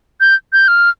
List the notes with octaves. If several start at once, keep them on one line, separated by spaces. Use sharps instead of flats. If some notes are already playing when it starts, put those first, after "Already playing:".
G6
G6
F6